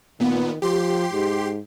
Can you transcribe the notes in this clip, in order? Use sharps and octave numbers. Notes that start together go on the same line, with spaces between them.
A#2 D#3 B3
F3 G4 C6
G#2